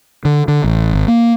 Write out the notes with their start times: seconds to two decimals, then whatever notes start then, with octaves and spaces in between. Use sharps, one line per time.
0.25 D3
0.48 D3
0.64 A1
0.94 G#1
1.08 A#3